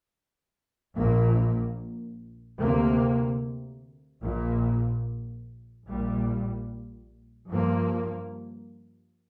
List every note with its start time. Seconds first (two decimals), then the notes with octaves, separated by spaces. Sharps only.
0.95 A#1 A#2 A#3
2.59 D2 C3 A#3
4.23 A#1 A#2 A#3
5.87 A#1 A#2 G3
7.51 G2 F3 A#3